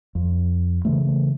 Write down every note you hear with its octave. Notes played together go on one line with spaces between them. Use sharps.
F2
C#3 E3 A3